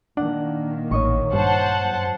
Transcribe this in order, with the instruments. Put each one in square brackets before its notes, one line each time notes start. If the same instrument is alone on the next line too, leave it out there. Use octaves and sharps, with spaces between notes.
[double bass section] A#2 D#3 A#3 [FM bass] D4 [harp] F#5
[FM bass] A1 [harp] C#5 D#5 C#6
[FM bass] G2 [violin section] C5 F#5 A5
[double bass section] F#2